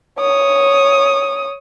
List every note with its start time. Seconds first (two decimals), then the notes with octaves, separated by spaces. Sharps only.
0.19 C#5 D#6